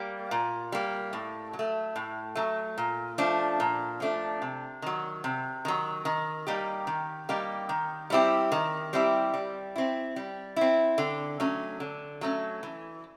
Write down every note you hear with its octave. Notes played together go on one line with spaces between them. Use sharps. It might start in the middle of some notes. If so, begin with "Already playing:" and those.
Already playing: G3 A#3
A#2
G3 A#3
A2
F#3
A3
A2
F#3 A3
A#2
F3 A3 D4
A#2
F3 A3 D4
C3
D#3 F#3
C3
D#3 F#3
D#3
G3 A#3 D#4 G4
D#3
G3 A#3 D#4 G4
D#3
G3 C4 E4 G4
D#3
G3 C4 E4 G4
G3
C4 E4
G3
C4 E4
D3
F#3 A3 C#4
D3
F#3 A3 C#4
E3